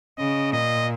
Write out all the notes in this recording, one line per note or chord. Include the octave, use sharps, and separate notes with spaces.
C#3 D#5
A#2 D#5